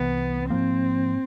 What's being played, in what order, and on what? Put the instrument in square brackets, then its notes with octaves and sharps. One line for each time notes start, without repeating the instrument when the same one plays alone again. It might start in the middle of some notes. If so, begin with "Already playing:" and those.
Already playing: [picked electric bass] C2 C3 E3 [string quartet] B3
[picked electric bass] G#2 F3 A#3 [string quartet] C4